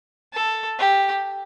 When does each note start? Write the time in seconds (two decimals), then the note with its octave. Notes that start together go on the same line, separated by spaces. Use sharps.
0.33 A4
0.79 G4